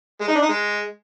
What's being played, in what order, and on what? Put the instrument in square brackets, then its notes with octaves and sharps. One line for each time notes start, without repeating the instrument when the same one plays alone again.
[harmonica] G#3
D#4
D4
D#4
G#3